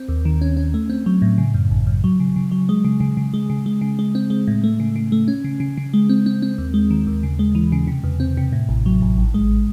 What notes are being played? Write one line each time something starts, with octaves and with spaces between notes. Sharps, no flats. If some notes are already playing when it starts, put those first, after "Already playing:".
Already playing: C4
D#2
D#3
C#4
C#4
A3
C4
F#3
A2
C#3
F#2
G#1
F#2
F#3
C#3
C#3
F#3
G#3
C#3
C#3
C#3
G#3
C#3
G#3
C#3
G#3
C4
G#3
A2
A3
C#3
C#3
A3
C#4
C#3
C#3
C#3
G#3
C4
C4
C4
D#2
G#3
D#3
D#2
C#3
G#3
E3
C#3
C3
E2
C4
C3
A2
A1
F#3
A1
G#1
G#3